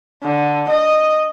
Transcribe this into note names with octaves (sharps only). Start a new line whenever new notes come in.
D3
D#5